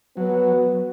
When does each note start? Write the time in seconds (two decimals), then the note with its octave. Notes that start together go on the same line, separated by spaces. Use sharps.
0.17 F#3 B3